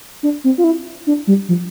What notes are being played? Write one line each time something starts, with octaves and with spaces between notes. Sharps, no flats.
D4
C4
F4
E4
D4
G3
F3